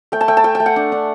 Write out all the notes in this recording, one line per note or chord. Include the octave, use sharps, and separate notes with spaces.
A3 G5
A5
A3 G5
A5
A3 G5
G5
A3
F#5
D4
D4